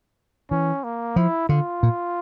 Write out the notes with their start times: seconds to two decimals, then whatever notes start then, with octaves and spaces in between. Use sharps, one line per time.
0.51 E3 C#4
0.84 A#3
1.16 F3 E4
1.49 D3 F4
1.83 A#2